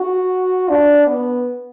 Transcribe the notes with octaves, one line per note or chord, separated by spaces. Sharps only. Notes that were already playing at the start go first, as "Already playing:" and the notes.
Already playing: F#4
D4
B3